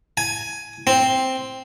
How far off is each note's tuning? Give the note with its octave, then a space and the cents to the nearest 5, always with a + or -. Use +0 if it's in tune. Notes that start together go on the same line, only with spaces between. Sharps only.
G#5 +10
C4 +0